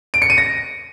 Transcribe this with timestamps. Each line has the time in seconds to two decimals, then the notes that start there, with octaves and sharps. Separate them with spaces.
0.14 D7
0.22 C#7
0.30 D#7
0.38 A#6